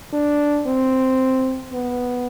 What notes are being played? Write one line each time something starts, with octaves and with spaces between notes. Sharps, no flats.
D4
C4
B3